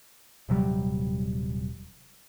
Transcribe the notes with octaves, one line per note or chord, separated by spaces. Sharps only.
D#1 C3 F#3 G3